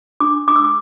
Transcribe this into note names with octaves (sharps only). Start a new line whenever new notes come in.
D4 D6
D4 D6
E6
D6